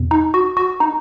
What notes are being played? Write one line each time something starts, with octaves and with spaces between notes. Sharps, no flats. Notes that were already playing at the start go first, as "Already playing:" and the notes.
Already playing: E2 B2
D#4
F#4
F#4
D#4